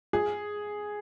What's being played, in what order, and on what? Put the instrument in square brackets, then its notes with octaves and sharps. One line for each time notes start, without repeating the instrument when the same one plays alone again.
[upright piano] G#4